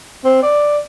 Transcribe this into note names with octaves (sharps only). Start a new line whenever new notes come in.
C4
D5